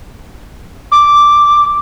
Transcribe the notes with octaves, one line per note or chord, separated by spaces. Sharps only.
D6